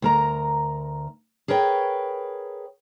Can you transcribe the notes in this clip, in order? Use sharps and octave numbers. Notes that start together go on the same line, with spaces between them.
D2 A#4 A#5
G#4 A#4 B4 C#5 G5